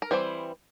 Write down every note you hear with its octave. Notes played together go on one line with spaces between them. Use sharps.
A#4
E3 G3 C4 C5